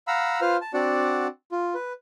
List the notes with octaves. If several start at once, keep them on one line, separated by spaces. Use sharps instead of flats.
F5 F#5 A#5 B5 E6
F4 B4 C5 F5 F6
A5
C4 D4 F#4 D5 F#5 A5
F4
B4